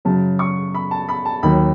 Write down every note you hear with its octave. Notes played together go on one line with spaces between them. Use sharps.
F#2 C#3 F#3 A5
C#6
B5
A5
B5
A5
D#2 D#3 F#3 B5